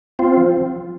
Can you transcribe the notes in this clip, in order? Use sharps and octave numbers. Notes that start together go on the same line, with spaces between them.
C4 F4
F3